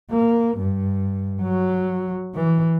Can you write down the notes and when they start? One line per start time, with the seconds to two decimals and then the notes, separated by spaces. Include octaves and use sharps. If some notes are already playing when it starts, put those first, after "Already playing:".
0.11 A#3
0.58 G2
1.42 F#3
2.35 E3